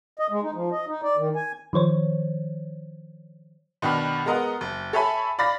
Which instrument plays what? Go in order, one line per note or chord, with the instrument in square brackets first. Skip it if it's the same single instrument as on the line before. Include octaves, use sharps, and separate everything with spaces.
[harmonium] D#5
G#3
D#4
F3
D#5
D#4
D5
D#3
G#5
[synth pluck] D#3 F3 C5 C#5
[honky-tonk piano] B2 D#3 D4 F#4 B5 F6
G#3 B3 A#4 D#5 F#5
F#1
A4 C#5 E5 G#5 B5
D5 F5 B5 A6 A#6